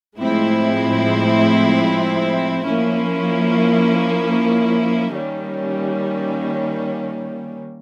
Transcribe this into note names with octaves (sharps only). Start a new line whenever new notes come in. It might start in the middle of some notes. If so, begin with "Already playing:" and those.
A2 F3 G#3 C4 E4
F3 A#3 C#4 E4
D#3 G3 A#3 C#4